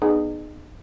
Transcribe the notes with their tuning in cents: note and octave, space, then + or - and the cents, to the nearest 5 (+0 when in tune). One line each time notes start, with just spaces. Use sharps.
B3 +0 D#4 -35 G#4 +0